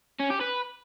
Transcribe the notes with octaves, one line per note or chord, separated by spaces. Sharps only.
C#4
G4
B4